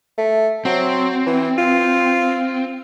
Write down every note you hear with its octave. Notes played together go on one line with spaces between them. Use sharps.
A3
F#3 C4
E3
F4